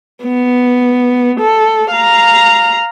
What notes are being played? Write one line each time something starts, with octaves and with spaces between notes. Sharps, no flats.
B3
A4
F5 A#5